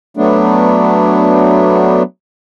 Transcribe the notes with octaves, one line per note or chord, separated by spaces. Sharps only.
F#3 A3 B3 D4